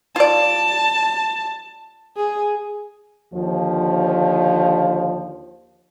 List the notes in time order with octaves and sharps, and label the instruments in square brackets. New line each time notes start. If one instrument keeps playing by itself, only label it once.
[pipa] F4 D5 [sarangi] A5
[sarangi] G#4
[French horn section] D#2 D3 F3